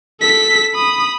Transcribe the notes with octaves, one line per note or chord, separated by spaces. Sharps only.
A4 B6
B5 D#6